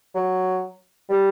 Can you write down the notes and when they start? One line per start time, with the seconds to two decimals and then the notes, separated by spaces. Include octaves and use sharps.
0.15 F#3
1.09 G3